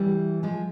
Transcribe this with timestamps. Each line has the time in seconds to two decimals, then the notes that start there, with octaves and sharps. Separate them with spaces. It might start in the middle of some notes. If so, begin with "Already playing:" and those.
Already playing: E3 G3
0.43 F3 G#3